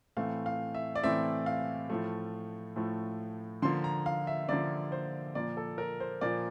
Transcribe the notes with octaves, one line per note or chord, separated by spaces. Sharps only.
A2 E3 A3 C4 F5
F5
E5
D5
A2 E3 A3 C4 E5
F5
A2 F3 A3
A2 F3 A3
D3 F3 A#3 C6
A#5
F5
E5
D3 F3 A#3 D5
C5
A#2 F3 A#3 D5
A4
A#4
C5
A#2 F3 A#3 D5